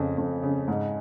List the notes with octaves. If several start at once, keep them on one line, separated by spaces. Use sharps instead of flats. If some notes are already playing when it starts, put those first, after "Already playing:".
Already playing: F2 C#3
F2
C#3
G#2